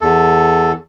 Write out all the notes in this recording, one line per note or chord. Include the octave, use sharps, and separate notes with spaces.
E2 A4